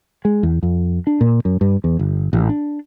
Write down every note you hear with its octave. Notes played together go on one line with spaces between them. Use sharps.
G#3
E2
F2
D4
A#2
F#2
G2
E2
G1
A1
D4